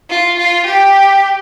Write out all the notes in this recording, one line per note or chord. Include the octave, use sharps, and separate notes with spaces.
F4
F4
G4